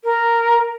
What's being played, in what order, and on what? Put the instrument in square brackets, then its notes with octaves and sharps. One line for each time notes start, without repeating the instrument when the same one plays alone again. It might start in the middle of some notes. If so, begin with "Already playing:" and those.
[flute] A#4